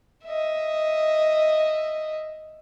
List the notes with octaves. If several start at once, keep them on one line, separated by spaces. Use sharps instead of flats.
D#5 E5